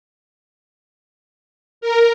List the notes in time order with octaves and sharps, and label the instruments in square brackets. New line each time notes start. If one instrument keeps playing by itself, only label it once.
[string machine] A#4